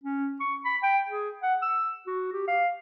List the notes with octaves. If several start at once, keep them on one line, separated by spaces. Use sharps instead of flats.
C#4
C#6
B5
G5
G#4
F#5
E6
F#4
G4
F5